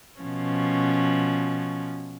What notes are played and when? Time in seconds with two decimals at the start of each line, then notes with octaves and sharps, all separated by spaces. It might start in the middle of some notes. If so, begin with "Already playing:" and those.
0.20 B2 F3 C#4